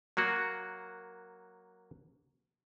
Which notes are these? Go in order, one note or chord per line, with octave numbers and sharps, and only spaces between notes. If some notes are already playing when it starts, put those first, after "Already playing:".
F#3 A#3 F#4